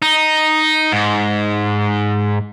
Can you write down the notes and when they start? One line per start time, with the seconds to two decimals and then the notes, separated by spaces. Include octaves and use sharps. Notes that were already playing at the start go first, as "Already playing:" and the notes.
0.02 D#4
0.92 G#2